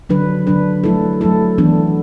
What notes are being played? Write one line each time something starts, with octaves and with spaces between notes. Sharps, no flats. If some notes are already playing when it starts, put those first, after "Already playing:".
D3 F#3 D4 B4
D3 F#3 D4 B4
F#3 A3 E4 A4
F#3 A3 E4 A4
E3 B3 D4 A4